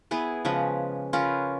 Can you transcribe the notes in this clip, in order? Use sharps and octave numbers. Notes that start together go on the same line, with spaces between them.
B3 E4 G#4 B4
C#3 F3 G#3 B4
C#4 F4 A#4 B4